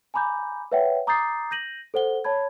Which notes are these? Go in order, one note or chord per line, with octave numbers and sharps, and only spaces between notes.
G#5 A#5 B5 D6 G6
B4 C#5 E5 F#5 G5
A#5 D6 D#6 G6 A6 C7
G6 A#6 D#7 F#7
A4 C5 F#5 G7
C#5 A5 B5 G#6